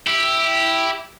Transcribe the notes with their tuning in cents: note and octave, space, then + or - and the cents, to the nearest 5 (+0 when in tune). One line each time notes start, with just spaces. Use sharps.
E4 +0 G4 +0